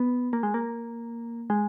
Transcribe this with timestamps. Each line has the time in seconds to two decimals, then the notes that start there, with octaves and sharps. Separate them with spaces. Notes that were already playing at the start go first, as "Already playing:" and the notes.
Already playing: B3
0.33 A#3
0.43 G#3
0.54 A#3
1.50 G#3